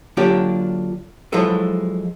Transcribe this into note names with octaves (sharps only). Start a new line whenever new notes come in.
D3 F#3 A#3 D4 F4 G4
F3 F#3 G#3 E4 A4 B4